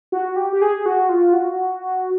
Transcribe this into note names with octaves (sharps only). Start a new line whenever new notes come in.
F#4
G4
G4
G#4
F#4
F4
F#4